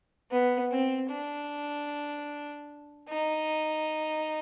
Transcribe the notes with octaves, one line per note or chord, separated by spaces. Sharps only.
B3
C4
D4
D#4